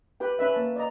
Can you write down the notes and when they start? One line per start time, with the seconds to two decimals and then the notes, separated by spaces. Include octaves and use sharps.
0.20 G4 B4 G5
0.39 C#4 B4 E5
0.54 A#3 A5
0.76 D5 D#5 A#5